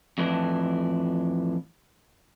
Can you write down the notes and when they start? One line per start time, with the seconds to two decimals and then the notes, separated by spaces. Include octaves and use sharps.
0.18 F2 A2 E3 D4